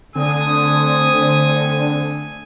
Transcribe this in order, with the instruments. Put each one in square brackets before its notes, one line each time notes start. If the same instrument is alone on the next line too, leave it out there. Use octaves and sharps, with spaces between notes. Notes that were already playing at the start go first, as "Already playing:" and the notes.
[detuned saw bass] D3 [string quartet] A3 G#5 [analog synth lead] C4 [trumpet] D#6